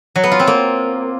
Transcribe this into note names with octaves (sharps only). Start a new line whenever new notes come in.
F#3
B3
F4
C4
A#3